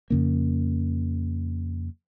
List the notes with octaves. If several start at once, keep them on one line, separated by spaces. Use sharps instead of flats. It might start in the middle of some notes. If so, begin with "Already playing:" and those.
F2 C#3 A#3